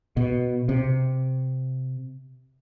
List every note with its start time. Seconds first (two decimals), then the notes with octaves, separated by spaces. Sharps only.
0.17 B2
0.69 C3